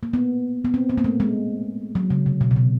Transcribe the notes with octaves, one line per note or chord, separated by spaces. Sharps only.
A#3
B3
B3
C4
B3
A#3
A3
G#3
F#3
C#3
C3
B2
B2
C3